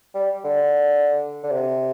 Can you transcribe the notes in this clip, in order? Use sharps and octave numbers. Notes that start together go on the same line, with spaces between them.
G3
D3
D3
C3